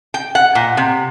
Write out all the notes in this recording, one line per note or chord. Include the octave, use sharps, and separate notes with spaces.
G5
F#5
A#2
C3